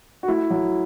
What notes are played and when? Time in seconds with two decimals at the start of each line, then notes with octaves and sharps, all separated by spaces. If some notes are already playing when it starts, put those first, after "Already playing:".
0.23 F#4
0.28 A3 E4
0.50 F#3